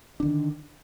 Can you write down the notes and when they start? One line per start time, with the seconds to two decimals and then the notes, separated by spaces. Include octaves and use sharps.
0.20 D4
0.23 D3
0.25 D#3